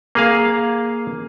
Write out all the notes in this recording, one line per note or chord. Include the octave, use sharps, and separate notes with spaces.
A#3 G#4 F5